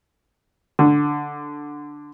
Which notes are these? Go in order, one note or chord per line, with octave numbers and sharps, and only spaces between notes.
D3